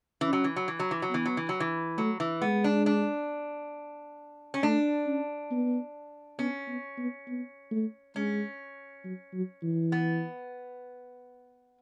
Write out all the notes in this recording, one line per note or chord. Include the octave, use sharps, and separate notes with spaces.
E3 C#4
F#3
E3
F#3
E3
F#3
E3
F#3
E3 B3
F#3
E3
F#3
E3
F#3 A3
E3
G#3 B3
D4
D4
C#4
A3 D4
C#4
B3
B3 C#4
B3
B3
B3
A3
G#3 C#4
F#3
F#3
E3
B3